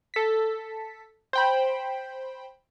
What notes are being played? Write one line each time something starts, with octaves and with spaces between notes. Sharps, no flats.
A4 B6
C5 G5 B5